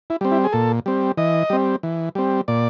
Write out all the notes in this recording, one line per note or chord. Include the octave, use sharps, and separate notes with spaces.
E4
G3 C4
E4
G#4
A#2 A4
G3 C4
E3 D#5
G3 C4
E3
G3 C4
A#2 D5